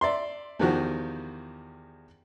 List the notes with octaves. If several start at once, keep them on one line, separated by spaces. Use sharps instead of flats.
D5 E5 C6
E2 D#3 F3 F#4 G4